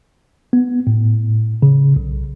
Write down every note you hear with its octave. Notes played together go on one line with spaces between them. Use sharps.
B3
A2
C#3
B1